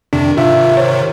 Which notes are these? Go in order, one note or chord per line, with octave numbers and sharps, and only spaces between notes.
F2 C3 D#3 D4
G#2 C3 D#3 F4 E5
C5 C#5